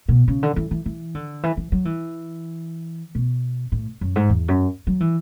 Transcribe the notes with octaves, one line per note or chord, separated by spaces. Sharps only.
B2
C#3
D3
E3
E3
E3
D3
E3
E3
F#3
E3
B2
A2
F#2
G#2
E2
F#2
F#3
E3